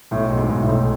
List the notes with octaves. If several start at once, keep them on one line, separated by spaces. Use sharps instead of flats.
B1 A2
B1
G#2
B1
A2
B1